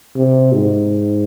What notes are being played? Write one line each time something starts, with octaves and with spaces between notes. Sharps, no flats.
C3
G#2